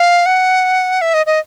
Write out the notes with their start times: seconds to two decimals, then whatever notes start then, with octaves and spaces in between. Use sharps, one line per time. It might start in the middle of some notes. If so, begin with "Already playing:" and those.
Already playing: F5
0.26 F#5
1.01 E5
1.14 D#5
1.26 D#5